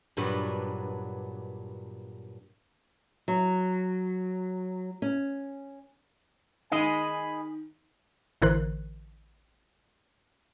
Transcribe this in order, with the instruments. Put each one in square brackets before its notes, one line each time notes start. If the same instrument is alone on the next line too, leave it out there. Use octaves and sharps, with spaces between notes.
[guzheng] G2 A#2 F#3 B3 D4
[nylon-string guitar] F#3
C#4
[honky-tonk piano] D#3 [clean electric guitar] G#4 D#5 [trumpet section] G#5 B5
[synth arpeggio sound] A1 D3 E3 A#4 C5 F#6